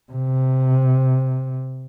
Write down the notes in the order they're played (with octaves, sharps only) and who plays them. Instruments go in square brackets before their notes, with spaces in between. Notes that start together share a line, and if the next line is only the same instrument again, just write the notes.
[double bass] C3